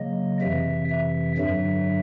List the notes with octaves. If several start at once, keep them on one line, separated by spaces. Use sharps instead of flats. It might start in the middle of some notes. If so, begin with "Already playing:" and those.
Already playing: C#3 F#3 A#3 D#5
F2 C3 E3 E5
E5
G2 D3 F#3 E5